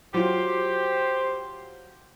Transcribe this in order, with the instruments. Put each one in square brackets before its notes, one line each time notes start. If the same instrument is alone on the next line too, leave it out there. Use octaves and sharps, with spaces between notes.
[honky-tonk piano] F#3 F4 [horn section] G4 C5